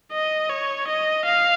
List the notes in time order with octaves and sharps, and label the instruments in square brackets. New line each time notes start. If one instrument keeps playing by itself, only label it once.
[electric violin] D#5
C#5
D#5
F5